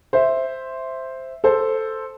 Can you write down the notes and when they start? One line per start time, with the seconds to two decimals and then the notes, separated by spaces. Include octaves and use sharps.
0.13 C5 E5
1.44 A4 C5